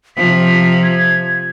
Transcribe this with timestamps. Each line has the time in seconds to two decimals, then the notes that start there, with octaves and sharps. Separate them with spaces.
0.17 C3 F3 B6
0.83 G#6